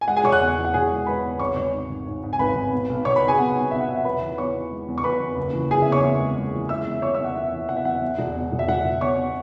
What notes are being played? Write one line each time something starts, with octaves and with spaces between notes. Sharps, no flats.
G#5
G#3 F#5
G#4 G#5
E1 C#5 C#6
F#5 F#6
E2
E3
F#5
E1 G#4 G#5
G#3
G#3 B4 B5
E2
G#1 C#5 C#6
G#1 C#5 C#6
G#2
G#1
G#2
G#2
G#5
G#1 B4 B5
G#1
B2
B1
B1 C#5 C#6
B4 B5
B1
G#4 G#5
B2 F#5
B2
B1 E5
F#5
B2 E5
F#5
E2 B4 B5
E3
E2 C#5 C#6
E3
G#3
E2
C#6
E2 B4 B5
E2
F#1
E3
F#1 G#4 G#5
E2 E5
C#5 C#6
E2
G#3
G#3
E3
G#3 E5 E6
E2
E2 C#5 C#6
E2 E5 E6
F#5
E2 E5
E3
E2 F#5
E5
E2 F#5
E2
E1
B2
E1
E5
E1 F#5
E1
B2 C#5 C#6
B2